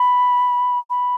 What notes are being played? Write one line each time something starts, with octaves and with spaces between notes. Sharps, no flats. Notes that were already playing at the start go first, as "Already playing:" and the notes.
Already playing: B5
B5